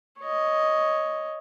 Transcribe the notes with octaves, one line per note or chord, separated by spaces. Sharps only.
C#5 D#5